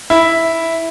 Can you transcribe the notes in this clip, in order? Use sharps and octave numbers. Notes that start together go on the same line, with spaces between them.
E4